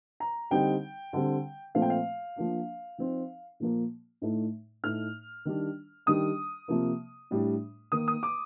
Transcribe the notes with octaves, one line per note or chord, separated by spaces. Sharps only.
A#5
D3 G3 C4 D#4 G5
D3 G3 C4
A#2 F3 A3 C4 F5
G5
F5
F3 A#3 D4
F3 C4 D#4
A#2 F3 A#3
A2 A3 D#4
A2 A3 D#4 F6
D#3 G3 D4
D#3 G3 D4 D#6
C3 F3 A#3
A2 G3 D4
D#3 A#3 D#4 D#6
D#6
D6